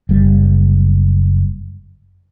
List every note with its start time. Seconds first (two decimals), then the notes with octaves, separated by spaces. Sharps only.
0.09 F#1 G3